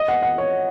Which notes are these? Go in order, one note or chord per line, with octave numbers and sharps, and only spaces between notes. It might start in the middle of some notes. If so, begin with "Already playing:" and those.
Already playing: D#5
F#5
F#5
C#5